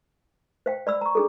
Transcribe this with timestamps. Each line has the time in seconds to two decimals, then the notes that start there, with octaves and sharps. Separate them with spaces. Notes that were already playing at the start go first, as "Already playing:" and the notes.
0.66 C5 F5 G5
0.87 D5 B5 E6
1.01 A#5 C#6
1.15 D4 G#4 A4